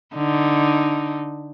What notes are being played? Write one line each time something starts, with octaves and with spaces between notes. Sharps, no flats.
D3 D#4